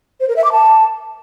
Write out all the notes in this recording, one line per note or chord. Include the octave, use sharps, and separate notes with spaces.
C5
A#4
E5
D6
A5